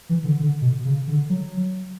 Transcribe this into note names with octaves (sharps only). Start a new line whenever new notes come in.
E3
D3
D3
B2
C#3
D3
F#3